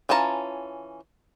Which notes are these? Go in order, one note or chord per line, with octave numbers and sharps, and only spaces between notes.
E3 C#4 F4 A5 A#5